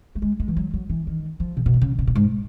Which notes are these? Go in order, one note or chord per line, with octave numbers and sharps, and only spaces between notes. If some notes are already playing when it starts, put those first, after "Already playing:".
A3
G#3
G#3
E3
F#3
F#3
E3
D#3
F3
C3
B2
C3
C#3
B2
A#2
G#2